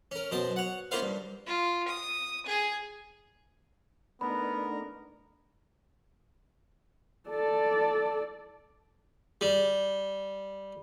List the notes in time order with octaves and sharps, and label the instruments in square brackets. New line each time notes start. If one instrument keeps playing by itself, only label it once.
[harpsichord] C#4 A#4
F#2 B2 C5 A5
C#5 F#5
A#3 C#4 E4 F4 C5 F5
G2
[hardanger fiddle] F4
D#6
G#4
[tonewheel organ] A3 D4 D#4 [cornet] B3 [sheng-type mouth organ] A#4 [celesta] B5
[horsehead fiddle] A4 D5
[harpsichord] G3